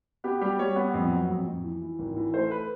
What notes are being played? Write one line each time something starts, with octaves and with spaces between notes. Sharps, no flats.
B3 G4
G3 G4
G3 C#5
B3
F2
F#3
F2
F2
E3
E3
G#1
E3
A3 C5
B4